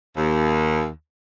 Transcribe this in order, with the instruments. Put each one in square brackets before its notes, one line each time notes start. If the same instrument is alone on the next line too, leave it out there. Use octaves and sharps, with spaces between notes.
[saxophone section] D#2